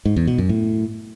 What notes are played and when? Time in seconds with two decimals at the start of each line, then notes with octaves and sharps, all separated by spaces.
0.06 G#2
0.16 E2
0.27 B2
0.38 F#2
0.49 A2